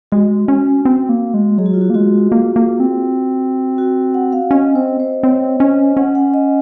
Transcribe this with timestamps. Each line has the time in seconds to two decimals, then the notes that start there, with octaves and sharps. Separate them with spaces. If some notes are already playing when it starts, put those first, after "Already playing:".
0.12 G#3 F#4
0.48 C#4
0.85 C4
1.09 A#3
1.34 G#3
1.58 F#3 G#4
1.66 F#4
1.74 F4
1.81 F#4
1.90 A#3
1.94 G#3 F#4
2.32 A#3
2.56 A#3
2.80 C4
3.78 F#4
4.14 F#5
4.33 F5
4.51 C#4 D#5
4.75 C4 C5
5.00 C5
5.23 C4 C#5
5.60 C#4 D#5
5.97 C#4 F#5
6.15 F#5
6.34 D#5